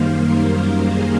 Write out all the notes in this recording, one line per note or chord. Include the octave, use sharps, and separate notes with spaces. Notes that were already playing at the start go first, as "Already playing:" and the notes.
Already playing: F#2 D#3 G3 A#3 C5 F5
A#4
A#4
G#4